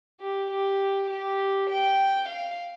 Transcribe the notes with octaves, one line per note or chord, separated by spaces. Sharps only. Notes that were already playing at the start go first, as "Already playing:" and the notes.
G4
G4
G4
G5
F5